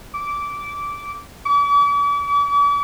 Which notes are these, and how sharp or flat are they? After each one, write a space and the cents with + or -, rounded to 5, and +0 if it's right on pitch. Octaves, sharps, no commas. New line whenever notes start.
D6 -15
D6 -45